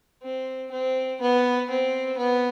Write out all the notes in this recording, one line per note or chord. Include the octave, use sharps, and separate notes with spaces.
C4
C4
B3
C4
B3